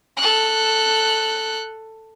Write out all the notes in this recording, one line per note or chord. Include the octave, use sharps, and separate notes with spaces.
A4 F#6